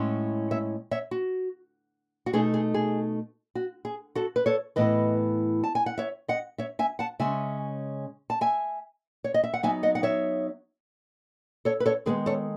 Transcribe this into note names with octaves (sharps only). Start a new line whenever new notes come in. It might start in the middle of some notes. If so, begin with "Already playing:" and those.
Already playing: A2 G#3 C#4 E4
C#5 E5
C#5 E5
F#4
F#4
B2 A3 D#4 G#4
G#4
G#4
F#4
G#4
F#4 A4
B4
A4 C#5
A2 E3 B3 E4 B4 D#5
A5
G#5
F#5
C#5 E5
D#5 F#5
C#5 E5
E5 G#5
F#5 A5
C#3 G#3 C#4 E5 G#5
A5
E5 G#5
C#5
D#5
E5
F#5
F#3 B3 D#4 E5 G#5
D#5 F#5
F#5
C#5 E5
A4 C#5
B4
A4 C#5
D#3 G#3 B3 G#4 B4
A4 C#5